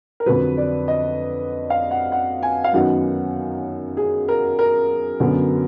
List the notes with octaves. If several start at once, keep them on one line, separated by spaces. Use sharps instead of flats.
A#4
F2 D3 F#3 B4
D5
D#5
F5
F#5
F#5
G#5
F5
F#2 D#3 F#3 B3 D#4 F#5
G#4
A#4
A#4
F#2 D3 F#3 B3